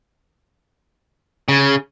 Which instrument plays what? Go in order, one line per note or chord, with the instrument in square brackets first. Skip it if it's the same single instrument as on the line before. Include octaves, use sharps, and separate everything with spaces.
[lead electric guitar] C#3